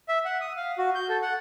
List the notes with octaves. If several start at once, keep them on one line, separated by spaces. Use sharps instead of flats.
E5
F#5
D#6
F5
F#4
G6
A4
F#5